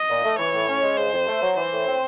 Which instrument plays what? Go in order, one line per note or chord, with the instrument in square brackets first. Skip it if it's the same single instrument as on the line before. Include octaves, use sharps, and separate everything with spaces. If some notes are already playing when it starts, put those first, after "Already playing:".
Already playing: [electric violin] D#5
[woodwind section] A#2
A3
[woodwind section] E3 [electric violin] C#5
[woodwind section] A2
C#4
G#3
[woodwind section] C#3 [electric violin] C5
[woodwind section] F2
A3
F#3
[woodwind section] E3 [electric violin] C5
[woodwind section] A2
C4